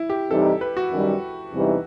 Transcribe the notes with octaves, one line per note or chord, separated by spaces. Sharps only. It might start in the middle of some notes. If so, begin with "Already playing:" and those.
Already playing: E4
G4
C3 E3 G3 D#4 A4
B4
F#4
F#2 D#3 G3
E2 C3 E3 G3 D#4